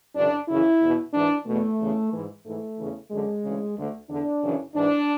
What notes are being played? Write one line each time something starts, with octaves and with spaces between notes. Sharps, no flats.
F#2 C#3 E3 D4
F#2 C#3 E3 E4
E2 B2
G#2 E3 D4
E2 B2 A3
E2 C#3 E3
G#2 E3
G#2 E3 A3
E2 C#3 E3
F#2 D3 G#3
D2 C#3 E3
D2 D3
E2 D3 D4
F#2 C#3 E3
G#2 E3 D4